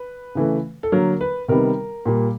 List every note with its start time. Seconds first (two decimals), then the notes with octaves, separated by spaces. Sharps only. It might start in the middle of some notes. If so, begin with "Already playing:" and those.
Already playing: B4
0.35 C#3 E3 A3
0.83 A4
0.92 D3 F#3 A#3 A#4
1.21 B4
1.48 C3 D#3 G3 B3 A#4
2.06 A#2 G3 A#3